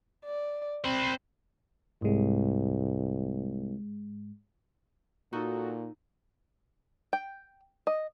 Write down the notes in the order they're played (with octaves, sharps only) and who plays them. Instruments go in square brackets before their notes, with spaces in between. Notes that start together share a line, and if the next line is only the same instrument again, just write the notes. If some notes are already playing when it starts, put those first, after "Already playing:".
[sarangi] D5
[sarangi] C4 [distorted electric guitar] C5 B5
[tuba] C2 [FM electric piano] G#2 G#3
[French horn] A#2 [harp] D#4 [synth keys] F#4 A4
[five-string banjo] G5
D#5